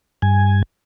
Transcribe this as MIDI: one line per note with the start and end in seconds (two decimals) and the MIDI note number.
0.22 0.62 43
0.22 0.62 80